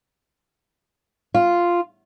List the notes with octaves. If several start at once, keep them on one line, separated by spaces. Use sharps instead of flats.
F4